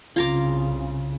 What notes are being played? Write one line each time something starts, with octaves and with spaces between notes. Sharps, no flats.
C2 C#3 F4 A#5 D6